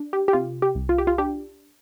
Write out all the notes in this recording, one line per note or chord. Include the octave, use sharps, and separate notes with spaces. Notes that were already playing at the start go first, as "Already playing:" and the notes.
Already playing: D4
G4
G4
C3 F4
G4
C2
F4
G4
F4
D4 G4